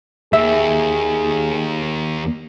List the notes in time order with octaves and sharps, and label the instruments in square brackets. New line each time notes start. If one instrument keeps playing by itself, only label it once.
[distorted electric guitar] D#2 [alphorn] G#4 [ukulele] E5